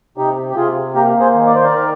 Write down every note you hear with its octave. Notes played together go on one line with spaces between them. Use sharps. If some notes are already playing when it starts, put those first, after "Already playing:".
C3 D#4 G4
G4
C3 F4 G#4
A#3 G4 A#4
G#4 C5
D#3
D5
C5
A#4 D5
D#3